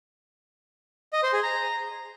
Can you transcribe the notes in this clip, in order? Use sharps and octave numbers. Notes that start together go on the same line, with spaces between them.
D#5
C5
G#4
A#5